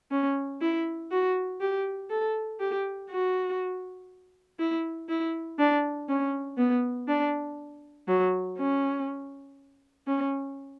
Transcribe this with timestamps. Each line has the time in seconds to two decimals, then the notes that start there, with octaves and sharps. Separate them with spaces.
0.11 C#4
0.61 E4
1.11 F#4
1.60 G4
2.10 A4
2.60 G4
3.10 F#4
4.59 E4
5.09 E4
5.59 D4
6.09 C#4
6.58 B3
7.08 D4
8.08 F#3
8.57 C#4
10.07 C#4